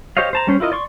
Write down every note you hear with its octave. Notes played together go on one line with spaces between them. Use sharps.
G4 C5 C#5 D#5 F5
C5 A5 A#5
G3 C#4 C5
E4 F4 A#4 D#5
D5 C6 C#6